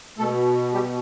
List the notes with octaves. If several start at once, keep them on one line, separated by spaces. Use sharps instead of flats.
B2 A3 A4
G3 G4